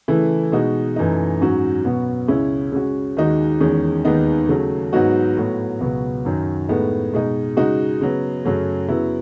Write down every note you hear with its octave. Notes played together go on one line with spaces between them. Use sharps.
C#3 E3 A3 E4
B2 G#3 D#4 F#4
F#2 E3 A3 D#4
G#2 F#3 C#4 F#4
B2 F#3 B3
C#2 C#3 G#3 C#4 E4
C#3 G#3 C#4 F#4
D#2 D#3 G#3 D#4 F#4
E2 D#3 G#3 C#4
D#2 D#3 G#3 B3 D#4
C#3 F#3 A3
G#2 F#3 B3 D#4 F#4
A2 F#3 B3
C#2 B2 F#3 B3
F#2 D#3 F#3
A2 G#3 B3 D#4
B2 G#3 D#4
C#3 G#3 D#4 F#4
C#3 F#3 B3
F#2 C#3 F#3 A3
C#3 F#3 B3 E4